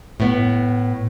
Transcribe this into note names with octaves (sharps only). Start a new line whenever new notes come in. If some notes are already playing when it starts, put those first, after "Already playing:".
A2 B3